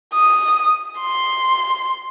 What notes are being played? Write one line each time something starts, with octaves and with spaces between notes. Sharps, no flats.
D#6
C6